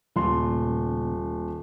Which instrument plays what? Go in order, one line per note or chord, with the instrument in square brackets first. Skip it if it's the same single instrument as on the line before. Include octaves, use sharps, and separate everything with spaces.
[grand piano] D#1 C6 [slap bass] A#2 C#3 A3